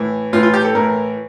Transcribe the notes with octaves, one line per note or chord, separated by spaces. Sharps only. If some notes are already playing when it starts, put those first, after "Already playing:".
Already playing: A2 E3
A2 E3 F4
F4
G4
A4
A2 E3 A#4